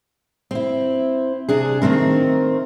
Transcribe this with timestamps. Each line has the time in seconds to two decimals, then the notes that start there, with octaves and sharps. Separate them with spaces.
0.51 C4 E4
1.49 C3 D4 G#4
1.82 D#3 A3 C4 A#4